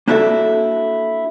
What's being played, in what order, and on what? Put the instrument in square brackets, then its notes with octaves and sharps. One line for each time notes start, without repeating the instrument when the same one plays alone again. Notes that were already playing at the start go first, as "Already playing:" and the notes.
[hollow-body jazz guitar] A#3 D4 E4 F#4 A4